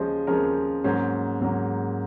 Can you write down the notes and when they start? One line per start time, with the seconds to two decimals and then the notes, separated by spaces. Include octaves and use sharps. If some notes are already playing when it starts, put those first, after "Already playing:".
Already playing: D#2 C#3 F3 G#3 C#4 C5 D#5
0.27 D#2 C#3 F3 G#3 C#4 A#4 C#5
0.84 G#2 F#3 A#3 C#4 C5
1.41 G#2 F#3 A#3 C#4